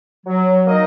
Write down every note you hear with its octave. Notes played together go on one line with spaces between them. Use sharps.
F#3
A#3 D#4 A#4 D#5